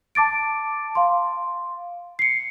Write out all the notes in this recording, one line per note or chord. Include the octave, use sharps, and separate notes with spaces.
A5 D6 A6 D7
F5 C6
C7 C#7